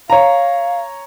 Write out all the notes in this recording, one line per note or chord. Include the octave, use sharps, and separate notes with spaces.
C#5 F5 A#5